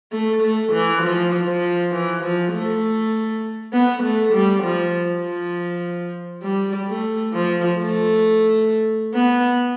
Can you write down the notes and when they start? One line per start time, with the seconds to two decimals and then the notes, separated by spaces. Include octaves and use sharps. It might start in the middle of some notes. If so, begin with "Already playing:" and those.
0.12 A3
0.43 A3
0.73 E3
1.02 F3
1.48 F3
1.93 E3
2.23 F3
2.53 A3
3.73 B3
4.03 A3
4.34 G3
4.63 F3
5.09 F3
6.43 G3
6.89 A3
7.34 F3
7.79 A3
9.14 B3